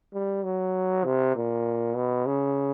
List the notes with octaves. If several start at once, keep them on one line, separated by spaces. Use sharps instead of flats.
G3
F#3
C3
A#2
B2
C#3